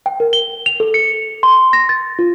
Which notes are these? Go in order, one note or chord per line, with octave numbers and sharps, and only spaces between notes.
G5
A#4
G7
F7
A4
C#7
C6
A#6
A6
F4